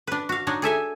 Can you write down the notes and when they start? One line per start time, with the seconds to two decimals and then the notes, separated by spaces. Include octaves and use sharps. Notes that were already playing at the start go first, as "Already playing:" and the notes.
0.07 D4 B4
0.29 F#4 F5
0.47 D4 D#4 C#5
0.62 G#4 A4 E5 G#5